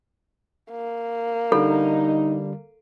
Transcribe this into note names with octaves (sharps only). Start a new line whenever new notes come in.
A#3
D3 G3 D#4 A4